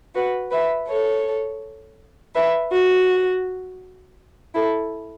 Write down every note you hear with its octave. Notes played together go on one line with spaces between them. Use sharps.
F#4 B4
B4 E5
A4 C#5
B4 E5
F#4
E4 A4